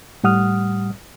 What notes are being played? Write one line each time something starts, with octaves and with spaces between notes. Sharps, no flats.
A2 G3 F#5 D#6 F6